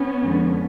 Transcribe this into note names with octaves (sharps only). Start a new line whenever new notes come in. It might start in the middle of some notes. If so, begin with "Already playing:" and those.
Already playing: B3 C#4
F2 D3 F3 G#3